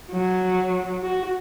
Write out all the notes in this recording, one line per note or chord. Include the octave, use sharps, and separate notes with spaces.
F#3
F#4